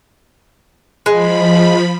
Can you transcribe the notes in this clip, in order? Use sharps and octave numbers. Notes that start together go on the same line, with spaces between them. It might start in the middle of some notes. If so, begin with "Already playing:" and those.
F3 G#3 B5